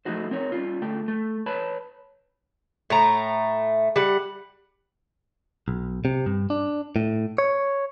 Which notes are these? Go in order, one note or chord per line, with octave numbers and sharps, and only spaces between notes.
F3 A3 D#4 E4 F#4 C5
C4 D#4 A#4 C#5
G3 C#4 F4
D2 A3 G5
A3
B4 C#5 A5 B5
A2 A3 A#5
G3 F#5
B1
C3
G2
D4
A2
C#5